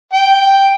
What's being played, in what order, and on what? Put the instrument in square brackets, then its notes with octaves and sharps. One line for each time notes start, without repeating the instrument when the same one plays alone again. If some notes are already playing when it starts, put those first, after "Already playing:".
[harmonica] G5